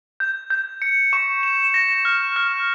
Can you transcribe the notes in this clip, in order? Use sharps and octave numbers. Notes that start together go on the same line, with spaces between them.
G6
G6
C#7
C#6
E7
A#6
F6
F6